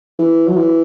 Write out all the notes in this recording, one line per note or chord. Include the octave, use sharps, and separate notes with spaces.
E3
F#3
E3